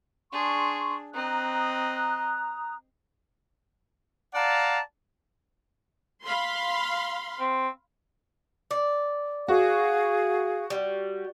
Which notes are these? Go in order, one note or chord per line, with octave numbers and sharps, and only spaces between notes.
D4 G#4 C6 C#6
C4 D#5 A#5 D#6 F#6
D5 F5 F#5 A5 A#5
F5 B5 C6
C4
D5
F#4 G#4 F5
G3